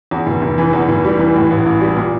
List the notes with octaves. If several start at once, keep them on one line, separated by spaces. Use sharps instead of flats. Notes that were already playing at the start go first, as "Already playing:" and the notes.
E2
F1
F1
E3
E2
F1
G3
E3
A2
A1
A1
G3
A#2